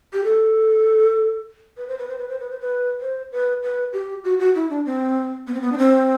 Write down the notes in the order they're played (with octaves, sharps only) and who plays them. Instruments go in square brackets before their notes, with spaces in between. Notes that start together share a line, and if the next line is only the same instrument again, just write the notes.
[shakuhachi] G4
A4
B4
C5
B4
C5
B4
C5
B4
C5
B4
C5
B4
B4
G4
F#4
F#4
E4
D4
C4
B3
C4
B3
D4
C4